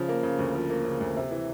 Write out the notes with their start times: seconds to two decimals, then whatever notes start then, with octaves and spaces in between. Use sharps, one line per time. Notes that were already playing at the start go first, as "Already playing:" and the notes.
Already playing: C#3 F3
0.09 A#3
0.23 C#3
0.39 D2
0.55 F3
0.70 A#3
0.85 C#3
1.01 D2
1.16 C3
1.31 E3